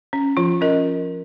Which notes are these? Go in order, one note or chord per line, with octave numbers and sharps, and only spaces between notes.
C#4
F3 F4
C#4 A#4 D#5